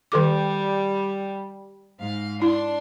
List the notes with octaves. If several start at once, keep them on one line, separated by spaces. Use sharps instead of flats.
D#3 G3 A4 D6
G#2 F5
D4 E4 C6